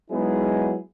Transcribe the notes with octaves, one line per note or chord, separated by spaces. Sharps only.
F#3 G#3 B3 D#4 E4 G#4